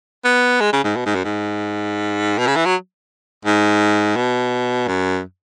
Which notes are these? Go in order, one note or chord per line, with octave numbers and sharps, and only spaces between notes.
B3
G#3
C#3
G#2
B2
G#2
F#2
G#2
B2
C#3
E3
F#3
G#2
B2
F#2